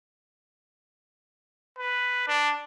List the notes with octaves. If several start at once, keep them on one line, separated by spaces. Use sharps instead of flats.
B4
D4